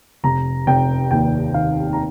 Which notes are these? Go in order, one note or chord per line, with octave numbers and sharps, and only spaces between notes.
F1 A#5
F1 G5
D#2 G5
D#3 F5
A#5